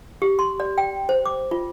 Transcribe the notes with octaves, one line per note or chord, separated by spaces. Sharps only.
G4
C6
D5
G5
C5
D6
F4